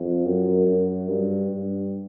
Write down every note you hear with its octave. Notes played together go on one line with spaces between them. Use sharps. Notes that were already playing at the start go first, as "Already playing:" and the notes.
Already playing: F2
F#2
F#2
G2
G2